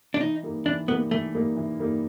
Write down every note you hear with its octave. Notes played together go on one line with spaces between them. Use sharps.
D4
E3 D#4
G3 A#3 D#4
E3 D4
G3 A#3 B3 D#4
E3 A3
G3 A#3 D#4
E3
G3 A#3 D#4